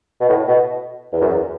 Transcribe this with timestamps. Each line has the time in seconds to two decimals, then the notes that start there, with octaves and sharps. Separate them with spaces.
0.21 B2
0.29 A2
0.48 B2
1.13 E2
1.21 F#2
1.28 E2